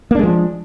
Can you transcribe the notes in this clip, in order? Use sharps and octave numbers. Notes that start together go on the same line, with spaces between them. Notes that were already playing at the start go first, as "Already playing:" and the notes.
F3 G#3 A#3 D4